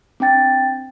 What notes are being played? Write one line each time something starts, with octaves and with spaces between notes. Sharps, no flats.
C4 D4 G5 A6